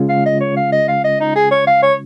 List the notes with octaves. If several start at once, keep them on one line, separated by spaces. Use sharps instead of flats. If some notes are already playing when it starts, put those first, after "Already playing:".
Already playing: C#3 G#3 C#4 F4
F5
D#5
C#5
F5
D#5
F5
D#5
D#4
G#4
C#5
F5
C#5